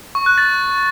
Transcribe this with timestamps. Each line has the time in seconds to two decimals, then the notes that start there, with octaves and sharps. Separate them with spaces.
0.15 C#6
0.26 F#6
0.38 A6